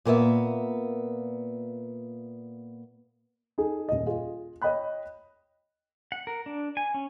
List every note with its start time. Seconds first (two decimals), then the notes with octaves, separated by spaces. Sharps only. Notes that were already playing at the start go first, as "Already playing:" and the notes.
0.05 A#2 A#3 B3 E5
3.58 D#4 G#4 A4
3.89 D#1 D#5
4.07 F4 G#4
4.62 C#5 D#5 G5 B5 F#6
6.12 F#5
6.27 A#4
6.46 D4
6.77 G#5
6.94 C#4